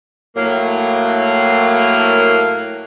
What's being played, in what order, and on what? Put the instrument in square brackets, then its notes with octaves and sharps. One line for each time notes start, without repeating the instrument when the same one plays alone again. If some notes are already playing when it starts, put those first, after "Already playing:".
[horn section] A2 F#3 A#3